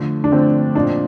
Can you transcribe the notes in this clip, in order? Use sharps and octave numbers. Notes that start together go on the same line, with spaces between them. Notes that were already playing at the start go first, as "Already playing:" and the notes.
Already playing: D3 F3 A3
D4
D3 F3 A3 C4
A#2 F3 C4 D4 D#4